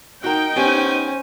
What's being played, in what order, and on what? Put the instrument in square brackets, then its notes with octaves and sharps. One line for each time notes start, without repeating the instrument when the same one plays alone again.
[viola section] D#4 G5 [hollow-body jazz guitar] F#4 A#4
[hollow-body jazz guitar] B3 G4 [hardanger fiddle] C#4 G#5 [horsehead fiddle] C5